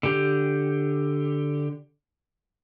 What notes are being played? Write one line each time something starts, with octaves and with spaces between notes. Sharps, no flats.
D3 G4